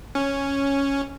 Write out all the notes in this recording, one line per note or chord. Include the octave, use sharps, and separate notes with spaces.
C#4